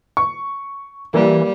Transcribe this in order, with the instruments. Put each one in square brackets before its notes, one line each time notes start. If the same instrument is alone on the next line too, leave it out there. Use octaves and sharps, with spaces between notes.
[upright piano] C#6
[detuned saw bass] E3 [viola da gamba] G3 [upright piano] A#3